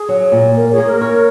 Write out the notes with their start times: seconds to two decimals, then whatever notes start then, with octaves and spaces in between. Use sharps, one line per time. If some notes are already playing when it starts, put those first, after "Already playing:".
Already playing: G#4
0.09 F#3
0.32 A#2
0.55 A#3 A#4
0.70 G#4 C#5
0.78 A#3
0.86 A#4
1.01 C#5